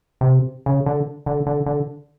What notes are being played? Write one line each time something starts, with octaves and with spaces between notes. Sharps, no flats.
C3
C#3
D3
D3
D3
D3